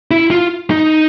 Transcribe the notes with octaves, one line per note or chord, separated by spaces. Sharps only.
E4
F4
D#4